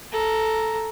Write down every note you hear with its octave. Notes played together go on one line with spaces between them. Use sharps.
A4 A#5